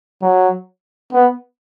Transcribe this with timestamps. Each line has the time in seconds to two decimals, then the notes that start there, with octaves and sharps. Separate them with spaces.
0.22 F#3
1.13 B3